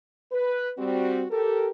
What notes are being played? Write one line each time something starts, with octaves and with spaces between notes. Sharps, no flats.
B4
G3 C4 F#4
G4 A4 A#4